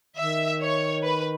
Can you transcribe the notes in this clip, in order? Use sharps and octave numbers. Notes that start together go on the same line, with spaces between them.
D#3 E5
C#5
B4